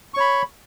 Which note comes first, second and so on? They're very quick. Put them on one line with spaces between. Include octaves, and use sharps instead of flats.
C#6 C#5 B5